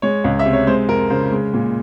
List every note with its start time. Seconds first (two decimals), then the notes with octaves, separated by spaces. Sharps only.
0.02 G#3 C#5
0.24 C#2
0.39 E5
0.45 C3
0.53 C#5
0.67 G#3 C5
0.89 F2 A#4
1.10 C#3 C5
1.32 G#3
1.54 A#2